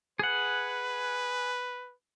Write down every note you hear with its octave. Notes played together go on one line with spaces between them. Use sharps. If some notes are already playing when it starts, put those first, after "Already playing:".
G#4 B4 F#5